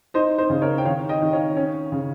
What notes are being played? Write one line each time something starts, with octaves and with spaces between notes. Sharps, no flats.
D#4 C5 D#5
C5 D#5
C#3
A#4 C#5
G5
D#3 C#5 F5
D#5 G5
D#3
C#5 F5
C#4
C#3